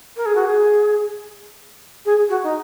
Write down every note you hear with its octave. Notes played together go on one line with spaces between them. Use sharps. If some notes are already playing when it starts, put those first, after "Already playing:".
A#4
G#4
F#4
G#4
G#4
F#4
D#4